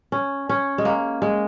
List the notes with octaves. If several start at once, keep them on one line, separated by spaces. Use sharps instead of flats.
C#4
C#4
G#3
A#3
G#3